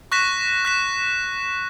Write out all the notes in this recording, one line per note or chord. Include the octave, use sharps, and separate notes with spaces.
C#6 F#6 A#6 B6 E7
F#6 B6 E7